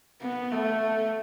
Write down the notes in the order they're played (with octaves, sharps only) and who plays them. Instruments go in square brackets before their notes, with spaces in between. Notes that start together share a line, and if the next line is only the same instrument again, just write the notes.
[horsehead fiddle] B3
A3